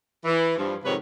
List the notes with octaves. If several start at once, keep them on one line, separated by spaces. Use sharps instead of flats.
E3
G2 F3
F2 G#2 C3 D#3 B4 C#5